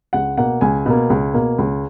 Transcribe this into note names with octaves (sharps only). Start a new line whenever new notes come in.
C#2 F#5
B2 A#3 F#5
C#2 G#5
B2 A#3
C#2
B2 A#3
C#2